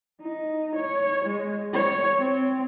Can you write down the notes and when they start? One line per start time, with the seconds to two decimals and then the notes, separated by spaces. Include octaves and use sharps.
0.22 D#4
0.76 C#5
1.26 G#3
1.73 C#5
2.18 C4